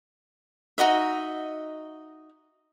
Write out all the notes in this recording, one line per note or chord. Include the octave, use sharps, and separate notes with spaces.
D#4 F#4 D#5 E5